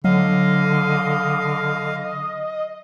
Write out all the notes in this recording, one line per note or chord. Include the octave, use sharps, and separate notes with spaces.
D3 F#3 D#5 F5